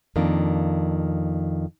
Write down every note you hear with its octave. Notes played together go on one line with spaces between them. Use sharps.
F2 D#3 A#3 D4